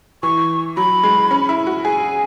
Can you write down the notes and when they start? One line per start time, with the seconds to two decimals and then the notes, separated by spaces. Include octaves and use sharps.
0.23 E3 C#6
0.77 F#3 B5
1.03 G#3
1.31 C#4
1.49 E4
1.67 F#4
1.84 G#4 G#5